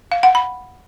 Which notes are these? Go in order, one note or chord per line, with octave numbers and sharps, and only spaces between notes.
F5
F#5
B5